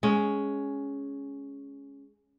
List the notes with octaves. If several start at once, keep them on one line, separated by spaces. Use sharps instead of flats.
G#3 C#4